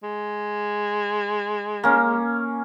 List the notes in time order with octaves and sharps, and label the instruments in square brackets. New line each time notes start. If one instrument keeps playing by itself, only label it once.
[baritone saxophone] G#3
[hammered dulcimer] A#3 C#4